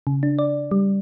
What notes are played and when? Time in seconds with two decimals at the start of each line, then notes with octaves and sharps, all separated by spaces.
0.07 C#3
0.23 D4
0.39 D5
0.71 G3